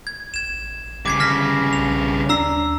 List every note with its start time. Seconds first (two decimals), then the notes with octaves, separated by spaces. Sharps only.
0.07 G#6
0.34 A1 G#6 E7
1.06 G2 C#3 D6 G#6 C7
1.20 D3 F6 A#6 B6
1.73 B1 F7
2.29 D#2 D4 A#5 E6 C7